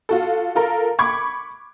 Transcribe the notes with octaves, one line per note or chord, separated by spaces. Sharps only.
F4 F#4 A4
F4 A4 A#4
B5 C#6 D6 G#6